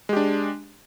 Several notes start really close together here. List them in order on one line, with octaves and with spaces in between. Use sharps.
G#3 G4 D4